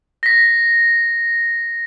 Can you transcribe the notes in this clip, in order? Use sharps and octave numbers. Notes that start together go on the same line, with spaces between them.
A#6 B6